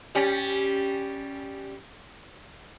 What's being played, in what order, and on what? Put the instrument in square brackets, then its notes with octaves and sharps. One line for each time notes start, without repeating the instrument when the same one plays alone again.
[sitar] G3 C#4